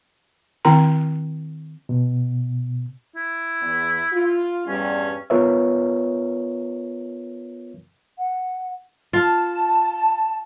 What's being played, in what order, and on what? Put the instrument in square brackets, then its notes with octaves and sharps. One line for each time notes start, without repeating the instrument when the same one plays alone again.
[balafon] D#3 C4 E4 A#4 G5 A#5
[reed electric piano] B2
[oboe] E4
[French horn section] E2
F4
[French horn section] E2 G2 G3 [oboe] C#4
[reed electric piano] B3 F4 A#4 B4 C#5 E5
[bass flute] F#5
[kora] F4 [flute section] A5